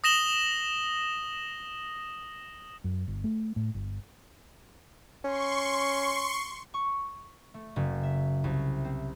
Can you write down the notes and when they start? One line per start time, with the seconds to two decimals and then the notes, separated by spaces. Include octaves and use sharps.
0.04 D#6 A#6 E7 F#7 G7
2.84 F#2
3.08 G1
3.24 A3
3.56 A2
3.75 G1
5.24 C#4 C6 C#6
6.74 C#6
7.54 A3
7.76 F#1
8.03 E5
8.44 C2
8.85 C4